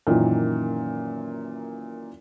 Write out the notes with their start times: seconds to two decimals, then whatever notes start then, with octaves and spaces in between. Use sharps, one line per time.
0.07 F#2 A#2 D#3 E3